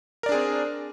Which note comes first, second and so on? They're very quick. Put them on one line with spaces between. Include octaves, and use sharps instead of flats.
A#4 D5 D4 G#4 C4